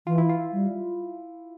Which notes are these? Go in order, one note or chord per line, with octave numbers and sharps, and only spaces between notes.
E3 F4
E4
F4
G3